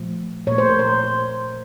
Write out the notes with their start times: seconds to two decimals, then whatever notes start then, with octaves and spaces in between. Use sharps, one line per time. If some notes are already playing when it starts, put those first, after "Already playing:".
Already playing: A#2 F3 A3
0.47 A#2 C#5
0.51 A3
0.58 C5
0.69 A#4
0.79 C5